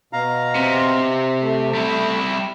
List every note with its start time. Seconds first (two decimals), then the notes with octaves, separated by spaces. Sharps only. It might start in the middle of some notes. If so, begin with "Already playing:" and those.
0.13 B2 F5 A#5
0.55 C3
1.41 A3
1.74 G3 E4